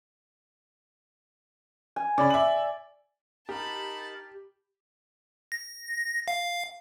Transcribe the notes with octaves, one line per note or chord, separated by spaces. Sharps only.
G#5
C#3 D5 B5
E5 F#7
D#4 G4 A#4 A5 B5
A#6
F5